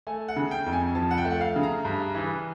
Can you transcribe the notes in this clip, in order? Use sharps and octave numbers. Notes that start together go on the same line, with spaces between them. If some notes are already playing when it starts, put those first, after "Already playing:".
A3 G#5
F#5
C#3
G5
F2
G#5
F3 A5
F#5
G5
A3
F#5
F5
C#3
A#5
G2
E3